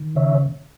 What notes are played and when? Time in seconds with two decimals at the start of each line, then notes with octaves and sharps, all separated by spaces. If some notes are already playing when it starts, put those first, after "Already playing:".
Already playing: D#3
0.15 C#3 C#5 E5